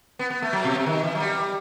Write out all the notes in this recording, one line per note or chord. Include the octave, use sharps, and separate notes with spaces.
B3
B3
A3
F#3
B2
C3
D#3
E3
F#3
G3